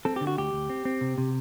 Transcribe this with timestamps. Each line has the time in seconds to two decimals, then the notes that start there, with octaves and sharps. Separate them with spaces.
0.05 C4 A4
0.16 D3 G4
0.27 F#4
0.38 D2 G4
0.53 D2
0.70 C4
0.85 C4
1.01 C3
1.18 C3